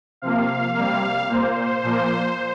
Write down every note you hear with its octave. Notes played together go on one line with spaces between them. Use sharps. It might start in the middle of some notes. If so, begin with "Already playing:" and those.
C3 F3 A#3 F5
C3 G3 A#3 F5
A#2 A#3 C5
A#2 F3 A#3